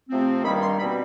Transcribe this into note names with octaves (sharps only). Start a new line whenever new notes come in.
C3 F3 A3 C4
G2 D#3 G3 A#3 B5
C6
B2 G3 C4 B5